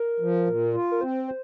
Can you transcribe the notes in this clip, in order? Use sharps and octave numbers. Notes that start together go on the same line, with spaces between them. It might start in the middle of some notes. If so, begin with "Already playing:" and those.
Already playing: A#4
F3
A#2
F4
A#4
C4 C5
C5